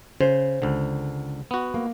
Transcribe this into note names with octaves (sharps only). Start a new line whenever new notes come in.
C#3 C5
C#2 D3
B3 F#4
A#3